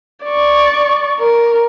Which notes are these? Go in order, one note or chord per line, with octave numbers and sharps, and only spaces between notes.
D5 C#6
A#4